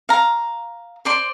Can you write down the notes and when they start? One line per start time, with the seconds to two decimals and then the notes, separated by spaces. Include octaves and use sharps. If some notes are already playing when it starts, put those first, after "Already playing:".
0.09 F5 A#5
1.05 C5 D5 C6